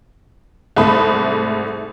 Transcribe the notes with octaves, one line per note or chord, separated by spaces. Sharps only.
C2 G#2 A3 B5 D#6